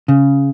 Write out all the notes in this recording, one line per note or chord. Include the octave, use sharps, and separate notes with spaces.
C#3